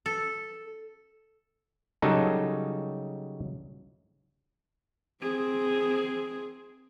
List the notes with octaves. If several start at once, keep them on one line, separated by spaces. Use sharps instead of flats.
A4
C#3 F#3 G3 D#4 A4
C4 G#4